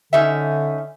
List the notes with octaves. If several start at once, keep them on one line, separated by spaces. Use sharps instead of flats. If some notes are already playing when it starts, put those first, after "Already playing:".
D3 C#4 D#4 E5